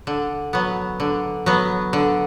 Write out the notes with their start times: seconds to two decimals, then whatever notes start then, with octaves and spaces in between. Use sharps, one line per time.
0.07 D3
0.53 F#3 B3
1.00 D3
1.46 F#3 B3
1.93 D3